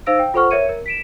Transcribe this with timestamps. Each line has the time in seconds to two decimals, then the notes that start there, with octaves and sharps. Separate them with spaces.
0.06 D#4 C5 F5 E6 A#6 D7
0.19 G5
0.34 F4 A4 C5 F#5 C#6 F6
0.51 A#4 C#5 E5 G#6 C#7 D#7
0.69 A#4
0.86 B6 D7 E7